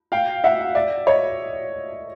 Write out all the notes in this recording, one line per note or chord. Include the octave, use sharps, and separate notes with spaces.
F5 G5
E5 F#5
D5 E5
C#5 D#5